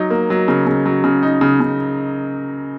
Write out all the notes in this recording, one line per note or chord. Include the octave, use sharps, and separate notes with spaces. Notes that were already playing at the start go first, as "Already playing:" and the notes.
Already playing: F#3 D#4
A#3
F#3
C#3
C#3
F#3
C#3
D#4
C#3
C#3